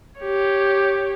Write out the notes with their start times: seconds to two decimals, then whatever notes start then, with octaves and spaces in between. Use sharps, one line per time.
0.20 G4 C#5